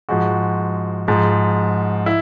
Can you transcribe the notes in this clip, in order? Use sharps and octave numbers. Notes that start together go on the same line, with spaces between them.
G#2 F3 G#3 F#4
G#2 F3 G#3
E4